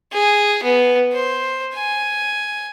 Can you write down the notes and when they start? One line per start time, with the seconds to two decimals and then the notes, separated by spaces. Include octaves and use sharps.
0.13 G#4
0.63 B3
1.13 C5
1.75 G#5